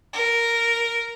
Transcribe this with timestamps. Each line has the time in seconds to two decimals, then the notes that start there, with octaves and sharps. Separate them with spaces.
0.13 A#4